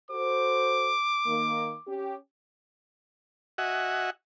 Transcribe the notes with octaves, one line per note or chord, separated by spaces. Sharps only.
F#4 A4 C5 D6
D#3 A#3
C#4 G4
F#4 D#5 E5 F#5 G#5